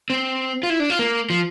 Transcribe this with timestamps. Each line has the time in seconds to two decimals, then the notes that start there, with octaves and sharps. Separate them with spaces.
0.10 C4
0.63 F4
0.70 E4
0.80 D4
0.90 F4
0.99 A#3
1.30 F3